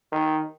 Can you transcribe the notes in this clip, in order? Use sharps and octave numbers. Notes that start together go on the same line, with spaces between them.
D#3